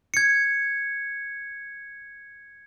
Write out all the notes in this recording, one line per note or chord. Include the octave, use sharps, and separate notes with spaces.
G#6 C#7